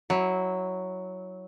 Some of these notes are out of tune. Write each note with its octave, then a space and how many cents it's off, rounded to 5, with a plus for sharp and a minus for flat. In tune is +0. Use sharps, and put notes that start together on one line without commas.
F#3 +0 E4 -20